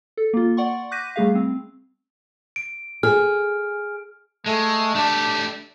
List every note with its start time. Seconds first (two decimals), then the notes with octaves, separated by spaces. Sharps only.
0.17 A4
0.33 A#3 F4
0.57 D5 F#5 C6 C#6
0.91 D6 F#6 G6 A#6 B6 D#7
1.16 G3 A3 G#4 F5
1.35 C4
2.56 D7
3.03 G#4 F6
4.46 G#3 A3
4.95 A3 D4 G4